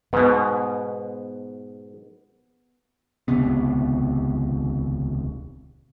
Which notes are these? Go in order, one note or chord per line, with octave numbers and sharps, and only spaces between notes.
G#2 B2 B3
D#1 C#2 C3 B3